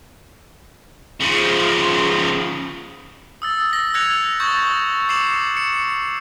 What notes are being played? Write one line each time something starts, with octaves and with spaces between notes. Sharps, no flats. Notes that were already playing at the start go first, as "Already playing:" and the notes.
C#3 F3
D#6 E6 A6
E6 A#6
E6 F#6 G#6 A#6 C#7 F7
C#6 D#6 G6 A6 A#6
D6 C7 C#7 E7 F#7
C#7